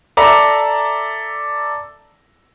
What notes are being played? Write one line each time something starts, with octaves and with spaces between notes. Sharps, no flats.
A4 D5 E5 A5 A#5